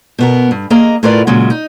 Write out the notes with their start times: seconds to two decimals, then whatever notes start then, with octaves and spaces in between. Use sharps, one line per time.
0.19 B2 B3 A#4
0.51 G2
0.70 A#3 G#4 D#5 A#5
1.03 A2 E4 F4 A#4 B4 D5
1.27 A#2 C#3 F#3 G#3
1.50 D#4